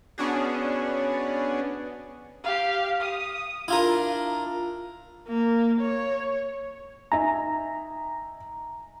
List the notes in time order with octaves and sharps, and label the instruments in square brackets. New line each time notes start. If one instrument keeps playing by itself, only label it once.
[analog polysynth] B3 C#4 D4 F#4 G#4
[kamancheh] G4 F5
D#6
[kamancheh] D4 [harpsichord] E4 F4 A#4
[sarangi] A#3
C#5
[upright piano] D#4 E5 G#5 [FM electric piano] A#5